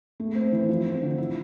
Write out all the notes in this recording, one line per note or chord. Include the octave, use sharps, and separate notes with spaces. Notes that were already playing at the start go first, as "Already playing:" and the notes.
A3
C4
E3
F3
C4
D3
E4